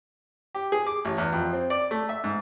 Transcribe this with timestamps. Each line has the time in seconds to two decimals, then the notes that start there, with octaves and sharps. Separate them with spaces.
0.55 G4
0.72 G#4
0.87 D6
1.05 A1
1.18 E2
1.33 F2
1.53 C4
1.70 D5
1.91 A3
2.09 E5
2.24 G#2